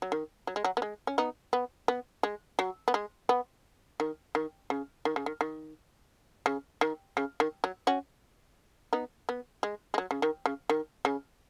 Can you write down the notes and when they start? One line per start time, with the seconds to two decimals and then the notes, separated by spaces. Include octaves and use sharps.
0.02 F#3
0.12 D#3
0.47 F#3
0.56 G#3
0.65 F#3
0.77 B3
0.82 G#3
1.07 C#4
1.18 B3 D#4
1.53 B3
1.88 B3
2.23 G#3
2.59 F#3
2.88 B3
2.94 G#3
3.29 B3
4.00 D#3
4.35 D#3
4.70 C#3
5.05 D#3
5.16 C#3
5.26 D#3
5.41 D#3
6.46 C#3
6.81 D#3
7.17 C#3
7.40 D#3
7.64 F#3
7.87 C#4 F#4
8.93 B3 D#4
9.29 B3
9.63 G#3
9.94 G#3
9.98 F#3
10.11 C#3
10.22 D#3
10.46 C#3
10.69 D#3
11.05 C#3